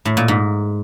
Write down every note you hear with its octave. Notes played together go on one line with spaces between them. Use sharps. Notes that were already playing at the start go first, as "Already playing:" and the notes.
A2
A#2
G#2